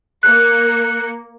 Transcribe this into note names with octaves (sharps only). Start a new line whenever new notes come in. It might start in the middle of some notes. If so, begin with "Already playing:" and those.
A#3 F#6 C#7